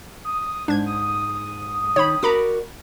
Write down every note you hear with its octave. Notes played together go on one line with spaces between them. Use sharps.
D#6
G#2 D4 G#6
D#6
D#3 C#5 B5
F#4 A#4 D5 A#5 B5 D6